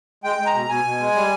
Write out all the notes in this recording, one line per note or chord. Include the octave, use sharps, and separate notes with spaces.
G#3 G5
G#3
A#5
B2
B2 G#5
B2
G#3
G3